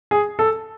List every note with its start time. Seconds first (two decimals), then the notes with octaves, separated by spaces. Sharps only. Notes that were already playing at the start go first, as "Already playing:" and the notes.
0.11 G#4
0.39 A4